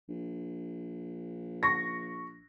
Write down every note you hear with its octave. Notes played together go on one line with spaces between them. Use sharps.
A#1
C#6 A#6